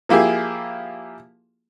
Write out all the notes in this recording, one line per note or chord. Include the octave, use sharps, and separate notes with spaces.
F3 A#3 E4 G4 G#4